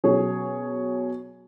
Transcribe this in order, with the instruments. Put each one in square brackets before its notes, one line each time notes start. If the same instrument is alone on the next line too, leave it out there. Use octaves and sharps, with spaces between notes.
[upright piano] B2 F#3 C#4 G#4 C#5